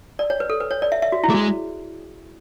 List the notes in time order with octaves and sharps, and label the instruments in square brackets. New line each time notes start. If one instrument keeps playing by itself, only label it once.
[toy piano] D5
C#5
B4
A4
B4
C#5
D5
E5
E5
F#4
E4
[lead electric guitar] A3 [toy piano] G#4
[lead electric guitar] G#3 [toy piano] F#4